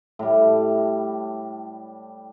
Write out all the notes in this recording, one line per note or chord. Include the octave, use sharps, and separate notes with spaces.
A2 G3